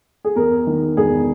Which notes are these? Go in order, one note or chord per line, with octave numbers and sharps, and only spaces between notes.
G#4
E2 A#4
D#3
E1 G#4